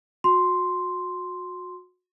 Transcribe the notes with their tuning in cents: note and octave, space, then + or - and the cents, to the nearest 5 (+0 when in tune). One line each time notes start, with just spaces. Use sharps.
F#4 -30 C6 +0